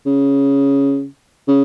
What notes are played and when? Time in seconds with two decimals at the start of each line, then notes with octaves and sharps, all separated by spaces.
0.06 C#3
1.48 C#3